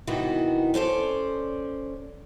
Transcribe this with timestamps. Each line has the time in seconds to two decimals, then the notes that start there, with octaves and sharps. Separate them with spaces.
0.07 C3 D#3 E3 B3 D#4 F#4
0.74 C#4 A4 C5 D5